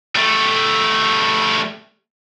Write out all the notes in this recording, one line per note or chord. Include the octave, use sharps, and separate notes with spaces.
G3 A3